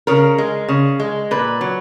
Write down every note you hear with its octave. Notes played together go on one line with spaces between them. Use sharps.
C#3 A#4
G#3
C#3
G#3
A#2 B4
F#3